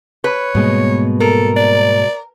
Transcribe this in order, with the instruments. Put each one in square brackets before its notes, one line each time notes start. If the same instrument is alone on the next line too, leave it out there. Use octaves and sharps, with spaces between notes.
[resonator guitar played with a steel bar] B4 [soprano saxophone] C#5
[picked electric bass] G#2 G3 A#3 [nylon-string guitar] B2 G#3
[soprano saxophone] A4 [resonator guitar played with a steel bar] A#4
[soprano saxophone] D5